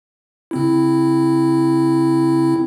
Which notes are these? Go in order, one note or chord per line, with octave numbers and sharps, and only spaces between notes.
C#3 C4 E4